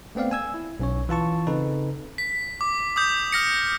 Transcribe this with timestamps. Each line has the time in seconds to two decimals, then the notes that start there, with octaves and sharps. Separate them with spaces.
0.15 A3 B3 C4 D5 F5
0.31 G#5 E6 G#6
0.54 E4
0.79 B1 C#4 C#5
1.09 E3 F4 A5 C#6
1.47 C#3 C4 D#4 A4 B4
2.18 B6
2.61 D6
2.96 D6 D#6 G6
3.32 F6 A#6 C#7